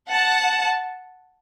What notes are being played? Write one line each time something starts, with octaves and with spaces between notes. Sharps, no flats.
F#5 A5